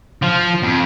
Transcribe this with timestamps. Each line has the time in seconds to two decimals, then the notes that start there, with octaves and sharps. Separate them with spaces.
0.23 F3
0.63 F2